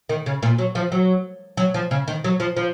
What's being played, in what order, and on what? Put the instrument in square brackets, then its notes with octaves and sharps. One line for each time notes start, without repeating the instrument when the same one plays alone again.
[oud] D#3
C#3
A#2
F#3
F3
F#3
F#3
F3
C#3
D#3
F#3
F3
F3